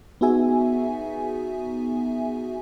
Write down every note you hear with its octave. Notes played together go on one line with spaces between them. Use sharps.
B3 D#4 F#4 G#4 E5 G#5